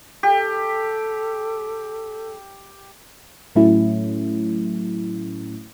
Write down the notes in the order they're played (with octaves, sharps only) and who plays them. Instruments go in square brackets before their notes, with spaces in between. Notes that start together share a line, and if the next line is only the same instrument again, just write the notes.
[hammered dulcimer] G4 [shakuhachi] A4
[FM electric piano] A2 F#3 A3 C#4 E4